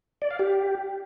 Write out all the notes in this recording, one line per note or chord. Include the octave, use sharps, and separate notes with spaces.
D5
F5
G4